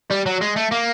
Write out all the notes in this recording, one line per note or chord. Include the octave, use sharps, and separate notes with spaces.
G3
F#3
G#3
A3
A#3